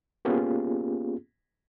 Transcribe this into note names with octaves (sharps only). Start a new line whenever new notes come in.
A#3 B3 C#4 F4 G4 G#4